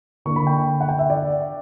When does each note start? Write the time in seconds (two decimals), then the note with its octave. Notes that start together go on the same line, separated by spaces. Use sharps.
0.25 D3 A#3 D4 C#6
0.36 B5
0.47 G5
0.81 F#5
0.89 G5
0.99 E5
1.10 D5